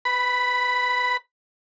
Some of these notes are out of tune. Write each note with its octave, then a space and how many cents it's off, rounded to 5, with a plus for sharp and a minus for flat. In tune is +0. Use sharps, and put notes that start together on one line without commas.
B4 +25 B5 +0